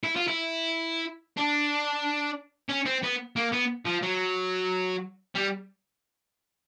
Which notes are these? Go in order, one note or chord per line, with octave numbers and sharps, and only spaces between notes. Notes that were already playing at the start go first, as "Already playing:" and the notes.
E4
F4
E4
D4
C#4
C4
B3
A#3
B3
F3
F#3
G3